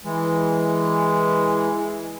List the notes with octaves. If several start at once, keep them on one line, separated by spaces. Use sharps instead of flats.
E3 G#3